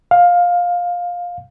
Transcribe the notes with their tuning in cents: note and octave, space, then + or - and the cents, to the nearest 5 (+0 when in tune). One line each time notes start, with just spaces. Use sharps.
F5 +15